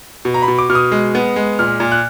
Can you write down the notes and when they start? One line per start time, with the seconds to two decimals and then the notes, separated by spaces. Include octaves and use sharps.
0.25 B2
0.34 A#5
0.42 B5
0.48 B2
0.58 D6
0.69 B2 F6
0.75 D#6
0.92 G#3
1.15 B3
1.36 G#3
1.59 A#2 F6
1.80 A#2
1.92 F#6